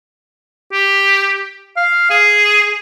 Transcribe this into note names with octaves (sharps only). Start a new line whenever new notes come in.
G4
F5
G#4